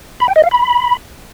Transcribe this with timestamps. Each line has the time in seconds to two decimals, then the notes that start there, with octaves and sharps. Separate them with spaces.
0.20 B5
0.28 G5
0.36 D#5
0.44 F5
0.51 B5